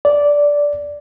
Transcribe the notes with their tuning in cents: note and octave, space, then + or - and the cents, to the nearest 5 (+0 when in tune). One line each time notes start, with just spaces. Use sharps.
D5 -10